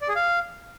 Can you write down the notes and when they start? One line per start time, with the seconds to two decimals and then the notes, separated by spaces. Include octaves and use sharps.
0.01 D5
0.08 G#4
0.16 F5